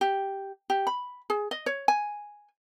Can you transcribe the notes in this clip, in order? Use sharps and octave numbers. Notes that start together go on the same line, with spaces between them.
G4
G4
B5
G#4
D#5
C#5
G#5